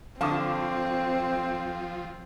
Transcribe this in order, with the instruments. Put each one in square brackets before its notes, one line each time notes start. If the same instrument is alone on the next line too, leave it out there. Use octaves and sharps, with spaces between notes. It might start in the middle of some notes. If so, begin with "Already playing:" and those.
[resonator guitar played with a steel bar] D3 A5 [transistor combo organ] F3 [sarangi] C4 [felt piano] F5 C#6 D6